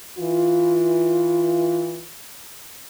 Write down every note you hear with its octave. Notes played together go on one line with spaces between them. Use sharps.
E3 F4